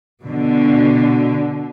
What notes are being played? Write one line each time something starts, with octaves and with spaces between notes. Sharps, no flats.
B2 D3